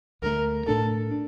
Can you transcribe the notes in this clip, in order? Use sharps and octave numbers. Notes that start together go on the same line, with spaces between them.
D2 D3 F3 A3 A#4
A2 A3 D4 A4
D4